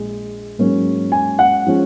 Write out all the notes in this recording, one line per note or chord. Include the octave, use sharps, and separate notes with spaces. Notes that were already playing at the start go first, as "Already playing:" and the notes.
Already playing: A#1 A#2 G#3
G#2 F#3 A#3 C#4
G#5
F#5
F3 G#3 C#4